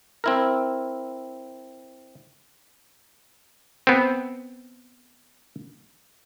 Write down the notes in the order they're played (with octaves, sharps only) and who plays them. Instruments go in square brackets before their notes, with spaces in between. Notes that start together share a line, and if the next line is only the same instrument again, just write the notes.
[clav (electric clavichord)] C4 E4 A#4
B3 C4